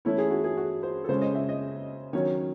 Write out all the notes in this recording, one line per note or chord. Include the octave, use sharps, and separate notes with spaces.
E3 A3 C#4 E4 C#5
G#4
F#4
G#4
F#4
C5
A4
C#3 G#3 C#4 C5
D#5
E5
D#5
D#3 F#3 C#4 C#5